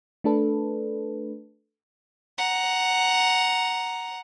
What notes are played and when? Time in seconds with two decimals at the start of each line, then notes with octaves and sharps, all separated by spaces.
0.24 A3 D4 A4 B4
2.38 F#5 A#5